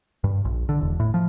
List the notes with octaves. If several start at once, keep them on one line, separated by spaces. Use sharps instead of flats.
G2
A#1
D3
E1
A2
F3